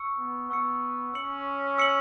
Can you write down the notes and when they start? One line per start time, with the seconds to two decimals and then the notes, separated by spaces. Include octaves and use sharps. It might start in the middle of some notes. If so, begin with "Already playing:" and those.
Already playing: C#6 E6 C#7
0.18 B3
0.50 B3 C#6 E6 C#7
1.14 C#4 E6 C#7 F#7
1.78 E6 C#7 F#7